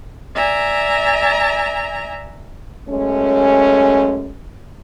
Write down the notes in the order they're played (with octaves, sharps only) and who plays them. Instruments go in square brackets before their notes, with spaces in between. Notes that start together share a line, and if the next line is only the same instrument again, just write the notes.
[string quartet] D5 E5 G#5 A#5
[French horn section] F#2 G#3 A3 C#4